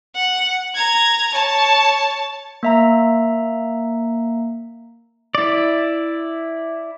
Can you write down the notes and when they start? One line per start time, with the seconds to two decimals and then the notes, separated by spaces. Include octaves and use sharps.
0.16 F#5
0.75 A#5 G#6
1.34 C#5 A5
2.63 A#3 E5 A#5
5.35 E4 D5